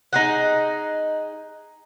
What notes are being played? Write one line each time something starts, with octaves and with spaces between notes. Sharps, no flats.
D#4 G#4 F#5